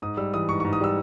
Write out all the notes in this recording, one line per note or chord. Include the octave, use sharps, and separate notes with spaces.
G#2 D#6
G3 E6
E3 D#6
G#2 C#6
G#2 C#6
D#6
G3 E6